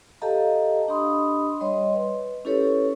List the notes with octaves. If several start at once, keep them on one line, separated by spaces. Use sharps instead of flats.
G4 A4 D#5 F5 A5 A#5
D4 G4 D#5 B5 C6 D#6
G3 C#5 D#5 C6
B4
C#4 E4 G4 A4 B4 C#5